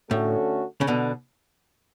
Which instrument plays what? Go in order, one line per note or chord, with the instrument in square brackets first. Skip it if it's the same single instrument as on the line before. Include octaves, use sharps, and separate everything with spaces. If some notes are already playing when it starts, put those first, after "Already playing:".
[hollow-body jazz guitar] A2 [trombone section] D3 A3 C#4 F#4 A4
[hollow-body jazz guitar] C#3
B2 D3